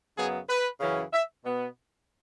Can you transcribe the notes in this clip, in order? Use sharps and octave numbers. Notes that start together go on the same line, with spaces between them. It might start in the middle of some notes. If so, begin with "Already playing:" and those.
F#2 C#3 F#3 B3 G#4
B4
F#2 C#3 E3 C#4
E5
B2 B3